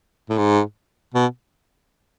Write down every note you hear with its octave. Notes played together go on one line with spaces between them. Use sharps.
A2
G#2
B2